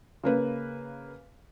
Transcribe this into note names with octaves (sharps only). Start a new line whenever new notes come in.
C#3 A#3 B4